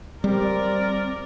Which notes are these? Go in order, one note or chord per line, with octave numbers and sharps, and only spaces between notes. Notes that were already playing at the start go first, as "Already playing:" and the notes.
G3 C4 A#4 D5